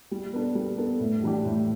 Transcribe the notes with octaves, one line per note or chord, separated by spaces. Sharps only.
G3
B3 D4 A4
G3
B3 D4 A4
A2
E3 G3 D4 G4
A2